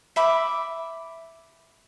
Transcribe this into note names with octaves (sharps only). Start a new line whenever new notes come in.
E5 B5 D6